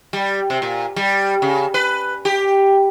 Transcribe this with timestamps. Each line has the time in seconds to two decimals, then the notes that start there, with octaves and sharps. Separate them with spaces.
0.13 G3
0.50 C3
0.62 A#2
0.96 G3
1.42 C#3
1.74 B4
2.25 G4